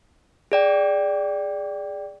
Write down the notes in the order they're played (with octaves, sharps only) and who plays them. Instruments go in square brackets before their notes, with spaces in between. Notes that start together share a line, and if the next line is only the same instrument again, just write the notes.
[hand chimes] G#4 D5 G5